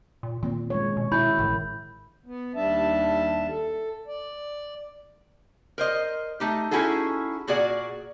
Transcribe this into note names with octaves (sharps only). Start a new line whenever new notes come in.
A#2
A#2 D#3 A#3 C4
G#3 C#5
B2
B2 E4 B5 G6
A1 A2 D#3
B3
D#2 G3 D4 E5 A5
A4
D5
A#4 C5 D#5
A3 D#4 G4
C#4 D#4 E4 F#4 G#4 A4
A#2 F#4 G#4 D5 F#5